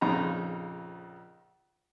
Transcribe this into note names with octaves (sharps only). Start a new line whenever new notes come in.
A#1 F2 C#3 D#4 A#5